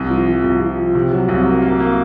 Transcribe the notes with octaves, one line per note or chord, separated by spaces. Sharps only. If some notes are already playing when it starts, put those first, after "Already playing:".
Already playing: C2
F3
F3
C2
F3
F3
C3
F#3
C2
A#3
A#3
A#3